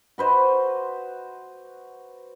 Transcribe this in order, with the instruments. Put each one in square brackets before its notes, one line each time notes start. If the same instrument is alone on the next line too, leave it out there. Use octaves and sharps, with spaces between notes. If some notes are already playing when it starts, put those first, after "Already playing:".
[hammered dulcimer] F#4 B4 C5 D#5